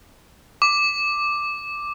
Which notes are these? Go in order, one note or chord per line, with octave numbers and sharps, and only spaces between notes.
D6